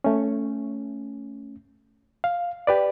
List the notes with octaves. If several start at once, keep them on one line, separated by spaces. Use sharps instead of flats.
A3 C#4
F5
G4 B4 D5